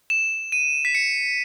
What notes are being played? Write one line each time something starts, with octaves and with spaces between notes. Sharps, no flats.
E7
D#7
B6
C#7